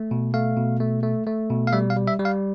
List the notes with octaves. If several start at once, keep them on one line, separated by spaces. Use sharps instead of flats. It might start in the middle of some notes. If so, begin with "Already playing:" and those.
Already playing: A3
B2
A3 F5
B2
A3
A3
A3
B2
F5
G3 E5
F5
G3
E5
G3
F5